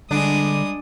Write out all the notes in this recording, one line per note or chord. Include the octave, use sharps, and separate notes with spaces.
D3 G3 G#3 D4 D#6